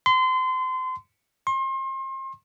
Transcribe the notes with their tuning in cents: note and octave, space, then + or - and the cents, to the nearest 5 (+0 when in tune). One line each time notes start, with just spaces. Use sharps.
C6 -30
C6 +35